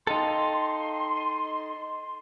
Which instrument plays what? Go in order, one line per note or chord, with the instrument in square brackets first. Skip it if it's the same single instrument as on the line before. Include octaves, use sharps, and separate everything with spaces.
[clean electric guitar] D#4 A4 [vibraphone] D#5 F5 G5 [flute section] C6
[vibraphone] D#5